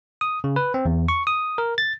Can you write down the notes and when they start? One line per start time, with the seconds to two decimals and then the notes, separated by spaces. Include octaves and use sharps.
0.21 D#6
0.44 C#3
0.56 B4
0.74 C4
0.85 E2
1.08 C#6
1.27 D#6
1.58 A#4
1.78 A6